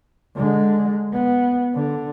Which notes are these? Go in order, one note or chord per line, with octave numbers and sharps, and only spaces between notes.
D3 G#3
B3
D3